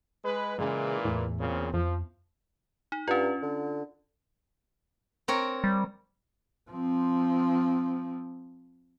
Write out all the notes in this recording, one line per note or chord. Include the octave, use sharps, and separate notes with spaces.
G#3 B4
A#2 C#3 E3 G#3
E2 A2
A#2 C#3 C4
F2 F3
D#4
G2 C#4 F4
D3
C4 A#4 C#5
G3
F3 C4